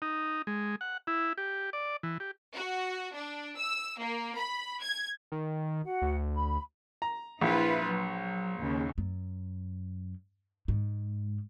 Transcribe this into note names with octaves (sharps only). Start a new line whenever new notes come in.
D#4
G#3
F#5
E4
G4
D5
E3
G4
F#4
D4
E6
A#3
B5
G#6
D#3
F#4 F#5
D2
B5
A#5
A#1 E4 F4 B4
F#3
D#2 C#3
F#2
G#2